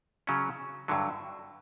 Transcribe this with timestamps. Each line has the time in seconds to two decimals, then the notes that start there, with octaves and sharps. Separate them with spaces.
0.27 C#3 F#3 C#4
0.88 G2 D3 F#3